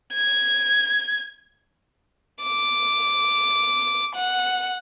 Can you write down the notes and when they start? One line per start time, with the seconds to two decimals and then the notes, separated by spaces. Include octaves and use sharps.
0.14 G#6
2.43 D6
4.15 F#5